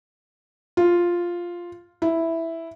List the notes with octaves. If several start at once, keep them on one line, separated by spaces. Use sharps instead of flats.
F4
E4